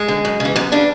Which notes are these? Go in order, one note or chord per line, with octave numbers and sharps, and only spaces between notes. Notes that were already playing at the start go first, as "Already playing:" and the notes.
Already playing: G#3
D3
F#2
C#3
E3
F#2 B3
C#3 E3 D4